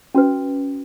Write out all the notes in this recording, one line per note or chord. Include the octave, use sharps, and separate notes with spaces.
C#4 F#4 B4